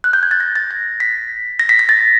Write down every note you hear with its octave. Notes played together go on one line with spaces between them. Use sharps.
F#6
G6
G#6
A6
A#6
A6
A#6
B6
A#6
B6
A#6
A6